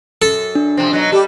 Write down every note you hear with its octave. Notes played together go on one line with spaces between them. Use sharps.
F#2 A4
D4
C3 F3 C4
B2 F#3 D#4
G3 G4 A4